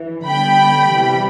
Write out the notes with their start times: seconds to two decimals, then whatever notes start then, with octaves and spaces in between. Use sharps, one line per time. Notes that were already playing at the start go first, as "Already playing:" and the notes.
Already playing: E3
0.26 D3 G3 B3 G5 B5
0.88 C3 E3 G3